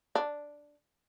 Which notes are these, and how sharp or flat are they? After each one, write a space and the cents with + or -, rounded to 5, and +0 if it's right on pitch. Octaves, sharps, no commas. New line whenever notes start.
D4 +0